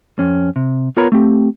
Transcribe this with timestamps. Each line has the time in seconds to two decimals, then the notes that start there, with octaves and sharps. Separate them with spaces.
0.19 F2 C#4
0.56 C3
0.97 B3 F4 A#4 C#5 A#5 B5
1.12 A3 C4 G4